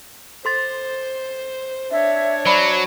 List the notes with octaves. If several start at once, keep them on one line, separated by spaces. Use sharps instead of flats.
A4 C5 C6 A6
D4 C#5 E5
F#3 C5 D5 B5